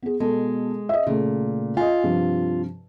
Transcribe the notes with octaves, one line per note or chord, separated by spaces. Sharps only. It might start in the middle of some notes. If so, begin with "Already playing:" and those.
B3 G#4
B2 G#3 A4
D#5 E5
A#2 C#3 A3
F4 D#5 G#5
G2 C3 F3